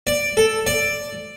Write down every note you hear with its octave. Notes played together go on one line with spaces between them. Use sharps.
D5
A4
D5